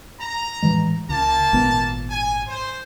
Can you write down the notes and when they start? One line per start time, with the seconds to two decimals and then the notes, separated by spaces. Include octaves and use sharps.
0.18 A#5
0.62 A2 E3 G#3
1.09 C#2 A#3 A5
1.53 G#1 A#2 B3
2.09 G#5
2.47 C5